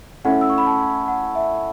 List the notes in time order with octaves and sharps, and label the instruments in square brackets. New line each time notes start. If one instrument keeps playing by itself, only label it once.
[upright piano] A3 C#4 E4 [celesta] F#5
[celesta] E6
C#6
B5
A5
F#5
E5